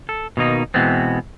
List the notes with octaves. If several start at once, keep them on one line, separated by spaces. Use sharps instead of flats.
A4
B2 D#3 A#3 D#4
B2 E3 G#3 B3 C4